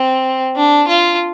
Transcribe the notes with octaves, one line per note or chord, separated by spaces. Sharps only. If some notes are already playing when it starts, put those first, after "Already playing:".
Already playing: C4
D4
F4